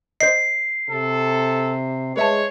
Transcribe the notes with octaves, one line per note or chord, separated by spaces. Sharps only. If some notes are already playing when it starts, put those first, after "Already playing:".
C5 D#5 C7
C3 A4
G#3 B4 C#5 E5 A5